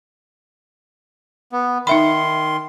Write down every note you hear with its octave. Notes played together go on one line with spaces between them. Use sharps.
B3
D#3 D#4 E5 B5 C6